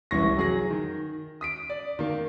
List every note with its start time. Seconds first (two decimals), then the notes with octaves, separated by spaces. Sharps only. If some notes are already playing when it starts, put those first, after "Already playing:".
0.11 F1 C2 E3 C#4 C#6 A#6
0.36 F#3 G#4 A#6
0.70 D#3
1.41 D#6 B6 D7
1.70 D5
1.99 D#3 A#3